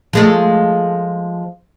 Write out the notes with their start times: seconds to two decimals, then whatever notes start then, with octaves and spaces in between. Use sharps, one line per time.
0.13 F3 G#3 A3